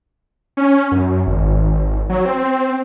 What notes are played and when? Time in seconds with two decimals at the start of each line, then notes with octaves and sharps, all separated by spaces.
0.57 C#4
0.92 F#2
1.27 G#1
2.09 F#3
2.25 C4